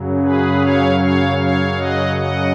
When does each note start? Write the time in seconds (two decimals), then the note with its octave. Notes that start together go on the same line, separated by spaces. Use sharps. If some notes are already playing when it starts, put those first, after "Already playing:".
Already playing: F#2 C#3 F#3
0.22 G#4 B4
0.61 C#5 F5
1.00 C#5 F5
1.39 C#5 F5
1.77 D#5 F#5
2.16 D#5 F#5